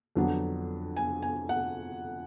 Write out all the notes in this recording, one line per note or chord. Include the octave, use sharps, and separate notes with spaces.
F2 D3 F#3 B3 D4
G#5
G#5
F#5